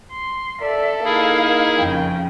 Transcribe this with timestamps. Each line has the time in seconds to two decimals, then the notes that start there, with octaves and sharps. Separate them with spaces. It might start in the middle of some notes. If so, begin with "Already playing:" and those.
0.12 C6
0.61 A4 D5 E5
1.05 A#3 D#4 E4 G#4 F5
1.77 F2 C#3 G5